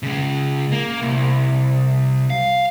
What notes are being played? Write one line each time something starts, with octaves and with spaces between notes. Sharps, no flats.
C#3 G#3
A#3
C2
F5